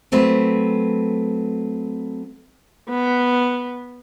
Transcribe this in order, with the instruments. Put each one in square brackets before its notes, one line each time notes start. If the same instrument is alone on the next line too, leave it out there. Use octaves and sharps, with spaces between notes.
[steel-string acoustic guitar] F#3 A3 C4 B4
[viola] B3